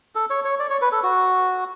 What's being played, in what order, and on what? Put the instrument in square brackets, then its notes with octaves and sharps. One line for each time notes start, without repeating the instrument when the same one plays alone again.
[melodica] A4
C#5
C#5
D5
C#5
B4
A4
F#4